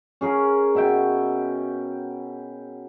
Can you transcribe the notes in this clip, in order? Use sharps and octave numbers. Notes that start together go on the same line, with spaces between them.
C#4 G#4 A#4
B2 E5 G5